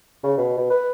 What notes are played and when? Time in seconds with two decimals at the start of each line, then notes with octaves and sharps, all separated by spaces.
0.23 C#3
0.37 B2
0.57 B2
0.70 B4